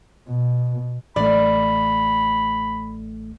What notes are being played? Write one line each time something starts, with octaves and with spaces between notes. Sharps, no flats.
B2
A1 A3 D5 B5